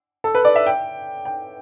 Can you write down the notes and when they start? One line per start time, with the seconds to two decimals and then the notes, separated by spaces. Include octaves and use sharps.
0.24 A4
0.35 B4
0.45 D5
0.56 E5
0.66 G5
1.25 G5